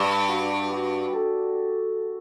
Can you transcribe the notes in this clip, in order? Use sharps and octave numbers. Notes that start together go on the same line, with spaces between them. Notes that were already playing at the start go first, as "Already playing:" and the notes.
Already playing: G2 D4
F#4
F#4
A4